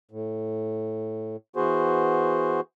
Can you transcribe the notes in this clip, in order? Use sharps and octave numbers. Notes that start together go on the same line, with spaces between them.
A2
E3 B3 F#4 G#4 C5